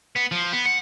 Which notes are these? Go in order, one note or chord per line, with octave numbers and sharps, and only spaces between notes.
B3
F3
B3
F#5